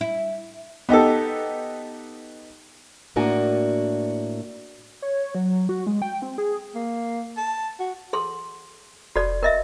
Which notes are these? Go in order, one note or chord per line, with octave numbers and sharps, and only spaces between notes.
E4
B3 D#4 G4 A4
A2 A#3 D4 F#4 G#5
C#5
F#3
F#4
G#3
G5
C4
G#4
A#3
A5
F#4
G#4 A4 C6
F1 F#4 A4 D5
A#4 D#5 E5